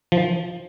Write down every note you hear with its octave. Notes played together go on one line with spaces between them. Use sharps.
F3